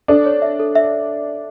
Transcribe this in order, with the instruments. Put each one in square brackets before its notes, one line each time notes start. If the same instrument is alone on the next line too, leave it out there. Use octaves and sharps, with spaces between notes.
[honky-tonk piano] D4 [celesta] A4
[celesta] C#5
E5
A4
E5